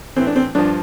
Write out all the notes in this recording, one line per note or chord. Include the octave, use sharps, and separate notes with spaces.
A2 E3 C4
D4
C4
G2 F3 D4